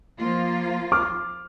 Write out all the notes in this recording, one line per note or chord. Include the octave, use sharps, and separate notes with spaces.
F3 A#3 F4
D6 F6